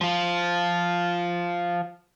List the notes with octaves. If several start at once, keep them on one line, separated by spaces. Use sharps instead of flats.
F3 F4